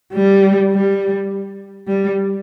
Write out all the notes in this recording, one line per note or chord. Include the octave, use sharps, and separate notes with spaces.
G3
G3
G3